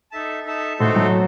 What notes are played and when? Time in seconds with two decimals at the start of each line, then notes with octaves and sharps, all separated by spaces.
0.12 D#4 A4 E5 A5
0.46 D#4 A4 E5 A5
0.79 A2 A3 D#4 F#4 A4 C5
0.96 F#3